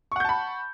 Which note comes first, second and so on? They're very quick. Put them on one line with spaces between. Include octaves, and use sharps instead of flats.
C#6 F#5 G6 A5 B5